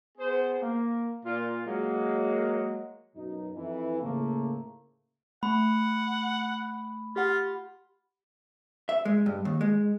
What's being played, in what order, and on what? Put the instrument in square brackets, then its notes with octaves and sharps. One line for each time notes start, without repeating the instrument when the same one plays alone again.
[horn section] B3 G#4 C5
A#3
A#2 F4
F#3 G#3 A#3
[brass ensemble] F#2 B2 D#4
F2 E3
A2 C#3 F3 A3 A#3
[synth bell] A3 [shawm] F#5 [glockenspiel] B5
[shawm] F4 [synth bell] G4 F#5
[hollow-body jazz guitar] E5
G#3
G2
D#2
G#3